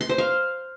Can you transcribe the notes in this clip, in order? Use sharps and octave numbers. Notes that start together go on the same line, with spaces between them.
C6
C5
F5